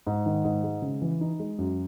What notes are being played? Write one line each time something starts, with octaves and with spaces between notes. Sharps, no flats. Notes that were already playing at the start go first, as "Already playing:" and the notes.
G#2
D#3
G#2
G#3
C#3
E3
D#4
G#3
F#2